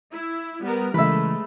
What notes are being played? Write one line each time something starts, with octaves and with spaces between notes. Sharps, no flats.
E4
G3 B3 A#4
C#3 E3 G#3 A3 B4 E5